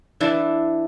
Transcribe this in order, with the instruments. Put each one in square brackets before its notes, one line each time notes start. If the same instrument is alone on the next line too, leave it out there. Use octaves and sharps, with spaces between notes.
[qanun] E3 D4 E4